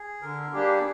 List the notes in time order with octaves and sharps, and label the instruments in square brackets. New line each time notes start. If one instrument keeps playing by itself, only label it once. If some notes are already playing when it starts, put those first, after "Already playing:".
Already playing: [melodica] G#4
[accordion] D3 [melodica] A#4
[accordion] G3 A#3 D4 G4 [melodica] G#4